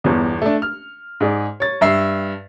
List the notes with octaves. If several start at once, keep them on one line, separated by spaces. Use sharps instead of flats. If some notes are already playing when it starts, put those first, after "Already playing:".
G1 E2
A3 D4
F6
G#2 G#4 D5
C#5 A6
G2 E5 C7